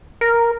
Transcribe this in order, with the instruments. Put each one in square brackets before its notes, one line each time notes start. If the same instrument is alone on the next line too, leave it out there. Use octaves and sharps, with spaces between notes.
[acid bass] A#4